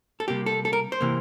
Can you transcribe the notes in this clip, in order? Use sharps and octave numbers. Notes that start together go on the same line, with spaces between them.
A4
C3 G3 A#3 G4
A4
A4
A#4
C5
C3 E3 A#3